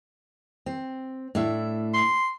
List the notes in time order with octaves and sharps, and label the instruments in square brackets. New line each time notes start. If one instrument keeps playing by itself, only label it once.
[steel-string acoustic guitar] C4
A2 D4 E5
[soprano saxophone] C6